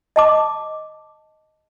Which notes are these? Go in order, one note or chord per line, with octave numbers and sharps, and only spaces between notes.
D#5 A5 D6